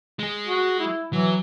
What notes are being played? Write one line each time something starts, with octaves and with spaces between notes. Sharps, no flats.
G#3 G#4
F#4
E4
E3 F#3